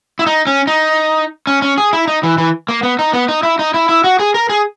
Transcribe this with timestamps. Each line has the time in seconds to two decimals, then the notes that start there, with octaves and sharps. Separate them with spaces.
0.19 E4
0.26 D#4
0.47 C#4
0.67 D#4
1.47 C#4
1.62 C#4
1.78 G#4
1.93 E4
2.08 D#4
2.23 E3
2.38 E3
2.69 A#3
2.83 B3
2.99 D#4
3.13 B3
3.29 D#4
3.43 E4
3.59 D#4
3.74 E4
3.89 E4
4.04 F#4
4.19 G#4
4.34 A#4
4.49 G#4